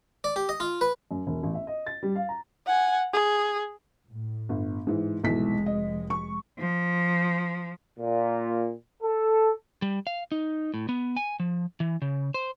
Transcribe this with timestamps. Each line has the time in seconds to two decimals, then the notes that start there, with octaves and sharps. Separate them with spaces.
0.24 D5
0.36 G4
0.49 D#5
0.60 F4
0.81 B4
1.11 F#2
1.27 E1
1.43 A1
1.55 E5
1.67 D#5
1.86 A6
2.03 G3
2.15 F5
2.29 A#5
2.67 F#5 G#5
3.13 G#4
4.11 A2
4.49 G1
4.87 G#2 E3
5.24 F1 B1 E3 G#3 B6
5.66 D#5
6.10 C#6
6.60 F3
7.99 A#2
9.03 A4
9.82 G3
10.07 F5
10.32 D#4
10.74 A2
10.89 B3
11.17 G#5
11.40 F3
11.80 E3
12.02 C#3
12.34 C5